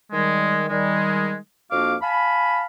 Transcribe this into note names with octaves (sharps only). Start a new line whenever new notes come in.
D#3 G3 G#3
D#3 G3 G#3
F2 A#3 D4 F#4 F5 D6
F5 G#5 A5 B5